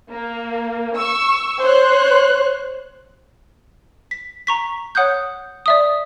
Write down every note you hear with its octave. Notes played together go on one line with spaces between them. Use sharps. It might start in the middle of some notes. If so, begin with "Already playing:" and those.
A#3
C#6 E6
C5 C#5 C6 F#6
B6
A#5 C#6 B6
C#5 F#5 D#6 F#6 G6
D5 E5 D#6